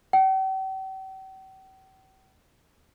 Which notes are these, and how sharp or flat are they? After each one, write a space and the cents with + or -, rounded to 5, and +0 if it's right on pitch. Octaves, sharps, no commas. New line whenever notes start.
G5 -45